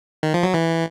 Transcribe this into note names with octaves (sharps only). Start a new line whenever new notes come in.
D#3
F3
F#3
E3